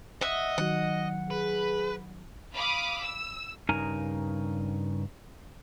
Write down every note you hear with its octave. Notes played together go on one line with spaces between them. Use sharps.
D#5 E5 F#5
D#3 F#3 F#5
G#4 B4
F5 B5 D6 D#6
E6
G2 C#3 D#4 A#4 G#5 A#5